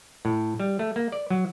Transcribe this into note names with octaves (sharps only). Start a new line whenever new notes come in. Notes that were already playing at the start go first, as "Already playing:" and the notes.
A2
G3
A3
A#3
D5
F#3